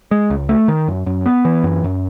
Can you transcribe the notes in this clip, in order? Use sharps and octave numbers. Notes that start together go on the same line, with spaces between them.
G#3
C#2
A3
D#3
F#2
F#2
B3
E3
F#2
F#2